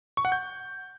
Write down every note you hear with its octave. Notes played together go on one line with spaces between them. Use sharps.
C#6
F#5
G6